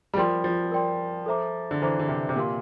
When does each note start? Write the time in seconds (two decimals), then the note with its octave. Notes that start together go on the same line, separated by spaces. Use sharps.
0.14 G3
0.17 F3 A#4 D5 G5 C6
0.44 F3
0.72 A#4 D5 G5 C6
1.26 A4 C5 E5 A#5 D6
1.71 D3
1.82 E3 A4 C5 E5 A#5 D6
1.99 D3
2.08 C3
2.29 C3
2.36 A#2 G4 A#4 F5 C6